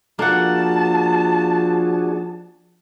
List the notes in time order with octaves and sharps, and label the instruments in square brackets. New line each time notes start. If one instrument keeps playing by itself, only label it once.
[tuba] F3 [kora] A#3 F#5 [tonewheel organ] D4 F#4 G#4 [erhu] A5